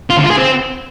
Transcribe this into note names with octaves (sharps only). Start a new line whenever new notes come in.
F4
D3
F4
G#4
C4